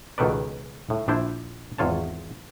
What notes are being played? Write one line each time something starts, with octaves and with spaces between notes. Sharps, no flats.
C#2 B2 D#3 A4 B4 D5
A2
A#1 D4 E4 C5
G#1 E2 F4 C#5 A5